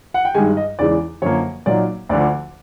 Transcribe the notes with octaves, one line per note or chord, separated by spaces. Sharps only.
F#5
G5
G2 D#3 G#3 G#5
D#5
E2 C#3 E3 G#3 D5
F#2 D3 F3 A#3 C#5
A#2 F#3 A#3 D#4 D5
D2 D3 F3 D5